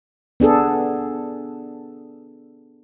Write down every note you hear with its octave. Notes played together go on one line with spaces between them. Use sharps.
B3 D4 G#4 A4